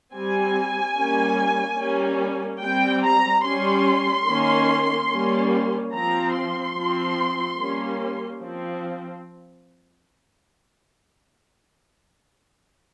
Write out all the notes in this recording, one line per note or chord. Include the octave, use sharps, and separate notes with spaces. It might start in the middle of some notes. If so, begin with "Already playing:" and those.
G3 C4 G#5
G3 A#3 C#4
G3 A#3 C#4
G3 C4 G5
A#5
G3 C#4 C6
D#3 A#3 C#4
G3 A#3 C#4
F3 C4 A#5
C6
F3 C4
G3 A#3 C#4
F3 C4